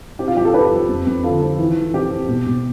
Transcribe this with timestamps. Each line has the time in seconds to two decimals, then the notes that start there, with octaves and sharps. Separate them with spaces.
0.19 C4 G4
0.28 F4
0.36 F3 G4
0.45 F4 A4
0.54 F3 G4 B4
0.72 F3
0.89 F2
1.07 F2
1.24 D3 F4 A4
1.41 F3
1.58 E3
1.76 E3
1.94 C4 G4
2.11 C4
2.28 B2
2.46 B2